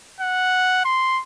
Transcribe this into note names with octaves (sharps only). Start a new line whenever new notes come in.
F#5
C6